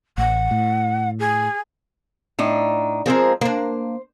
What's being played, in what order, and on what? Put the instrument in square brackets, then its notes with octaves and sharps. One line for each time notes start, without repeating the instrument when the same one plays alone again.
[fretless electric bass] A1 [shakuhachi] F#5
[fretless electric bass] A2
[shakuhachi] G#4
[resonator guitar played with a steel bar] A2 D4 D#4
[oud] F3 G#3 [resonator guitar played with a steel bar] C4 G#4 A#4
[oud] A#3 D4 [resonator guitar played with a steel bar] C5